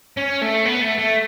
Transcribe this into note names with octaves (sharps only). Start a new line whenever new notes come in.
C#4
A3
B3
A3
A3